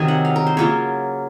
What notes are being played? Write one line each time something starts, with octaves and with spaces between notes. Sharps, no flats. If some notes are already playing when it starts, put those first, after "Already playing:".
Already playing: C3 D#3 F#3 D#5 G#5
F#5
F5
A#4
C5
C#3 F#3 A#3 F4 C#5